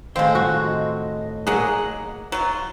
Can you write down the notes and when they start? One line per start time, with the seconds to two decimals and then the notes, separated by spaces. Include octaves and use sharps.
0.16 A2 D#3 G#3 C4 F5 C6
0.35 F4 F#4
0.65 D#5
1.47 F#3 A#3 G#4 F#5
2.32 F#3 F4